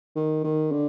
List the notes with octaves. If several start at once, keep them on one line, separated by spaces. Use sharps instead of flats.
D#3
D#3
D3